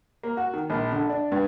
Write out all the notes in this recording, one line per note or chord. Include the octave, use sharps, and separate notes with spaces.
A#3
F#4
D#3
A#1
D3
D4
G2